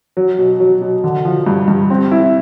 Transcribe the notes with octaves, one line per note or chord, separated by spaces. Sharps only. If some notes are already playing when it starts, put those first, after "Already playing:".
F#3
B2
F#3
B2
D3
F3
G2
G2
C4
E4